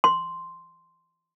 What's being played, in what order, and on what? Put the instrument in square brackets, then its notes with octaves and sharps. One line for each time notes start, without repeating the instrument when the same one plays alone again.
[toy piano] C6